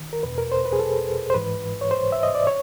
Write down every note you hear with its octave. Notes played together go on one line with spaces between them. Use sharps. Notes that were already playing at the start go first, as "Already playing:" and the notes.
Already playing: D#3
A#4
E2 B2 B4
A#4
C5
B4
G#4
A4
C5
G#2 E3 B4
C#5
C5
E5
D#5
D5
C#5